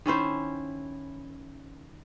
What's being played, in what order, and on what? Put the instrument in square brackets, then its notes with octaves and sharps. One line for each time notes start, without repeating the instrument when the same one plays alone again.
[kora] D#3 C#4 E4 C5